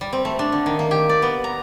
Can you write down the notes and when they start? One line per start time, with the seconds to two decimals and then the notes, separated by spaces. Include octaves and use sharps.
0.01 G3
0.13 C4
0.25 A3
0.39 D4
0.52 D3
0.66 D#3
0.79 A#3
0.91 G4
1.09 D5
1.22 B3
1.44 A#5